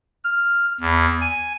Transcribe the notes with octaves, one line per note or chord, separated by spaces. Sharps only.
F6
E2
G#5